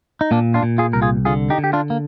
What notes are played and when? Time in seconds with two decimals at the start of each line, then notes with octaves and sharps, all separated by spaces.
0.21 D#4
0.31 A#2 A#3 D4
0.54 D4 F4
0.63 A#2
0.78 F4 G#4
0.93 C2 A#4
1.02 F4 G#4
1.25 D3 F4 G#4
1.50 D#4 G4
1.58 D3
1.64 G4
1.73 D4 F4
1.90 A#3